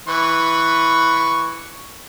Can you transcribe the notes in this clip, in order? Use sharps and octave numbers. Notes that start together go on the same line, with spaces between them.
E3 B4 C#6